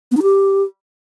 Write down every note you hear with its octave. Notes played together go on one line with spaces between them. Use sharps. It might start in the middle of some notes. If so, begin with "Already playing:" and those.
B3
D#4
G4